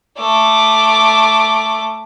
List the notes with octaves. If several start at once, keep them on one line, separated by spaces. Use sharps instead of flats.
A3 D6